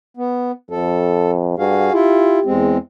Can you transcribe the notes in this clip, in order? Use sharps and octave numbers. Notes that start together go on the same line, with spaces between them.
B3
F2 A4
G2 F#4 G#4 F5
E4 F4 G4
E2 G#3 C4